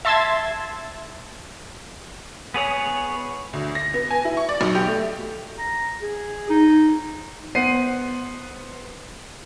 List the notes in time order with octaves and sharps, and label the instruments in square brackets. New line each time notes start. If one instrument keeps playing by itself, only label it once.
[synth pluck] E5 A5 C6 E6 G#6 A6
[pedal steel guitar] B3 G#4 C#5 D#6
[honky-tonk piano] D2
A#6
B3
G#5
E4
C#6
D5
B1
G4
A3
[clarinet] A#5
G#4
D#4
[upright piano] B3 C5 F#5 C7 D#7